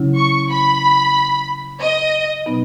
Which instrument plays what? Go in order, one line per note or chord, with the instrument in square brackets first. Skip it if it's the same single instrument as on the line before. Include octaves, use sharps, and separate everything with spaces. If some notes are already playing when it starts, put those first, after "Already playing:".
Already playing: [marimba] C#3 F#3 C#4 E4
[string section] C#6
B5
D#5
[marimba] B2 F#3 B3 D#4